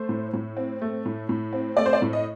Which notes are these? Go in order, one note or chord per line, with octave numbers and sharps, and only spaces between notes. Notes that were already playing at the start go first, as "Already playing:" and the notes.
Already playing: A3 C5
A2
A2
C4
A3
A2
A2
C4
A3 D5
C5
D5
A2
D#5